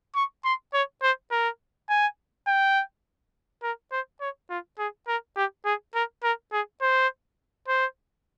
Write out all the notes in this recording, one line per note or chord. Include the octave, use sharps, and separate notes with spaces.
C#6
C6
C#5
C5
A#4
G#5
G5
A#4
C5
C#5
F4
G#4
A#4
G4
G#4
A#4
A#4
G#4
C5
C5